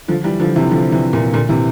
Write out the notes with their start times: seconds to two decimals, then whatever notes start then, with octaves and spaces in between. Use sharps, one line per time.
0.08 D3 F3
0.24 E3 G3
0.40 D3 F3
0.56 C3 E3
0.71 D3 F3
0.92 C3 E3
1.13 A#2
1.33 A#2 D3
1.49 C3 E3